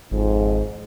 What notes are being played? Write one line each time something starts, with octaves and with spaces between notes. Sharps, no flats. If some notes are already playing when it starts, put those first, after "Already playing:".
G#1 F2 G#2